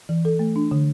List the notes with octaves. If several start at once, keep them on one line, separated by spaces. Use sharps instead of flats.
E3
A4
A3
D4
D3